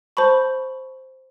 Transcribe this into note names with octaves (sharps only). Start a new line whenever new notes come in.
C5 A5 B5 C#6